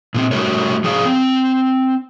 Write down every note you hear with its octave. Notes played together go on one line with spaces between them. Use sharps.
A#2 A#3 C4
D3 G3 A3 F#4 A#4 C#5
F3 G#4 D5 F5
C4